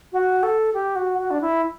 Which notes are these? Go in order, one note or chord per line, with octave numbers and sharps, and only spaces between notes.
F#4
A4
G4
F#4
F#4
D4
E4